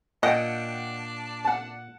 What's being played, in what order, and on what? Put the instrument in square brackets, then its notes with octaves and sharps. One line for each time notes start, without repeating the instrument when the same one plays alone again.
[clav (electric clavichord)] A#2 [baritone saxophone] D4 [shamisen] D#5 [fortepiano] F#5 G5
[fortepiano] F#5 A5